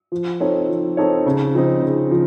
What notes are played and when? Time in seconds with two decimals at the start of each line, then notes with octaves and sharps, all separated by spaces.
0.12 F3
0.40 C4 D#4 A4 C#5
0.69 F3
0.97 C4 D#4 A4 C#5
1.26 C#3
1.54 F3 C4 D#4
1.82 C#3
2.11 F3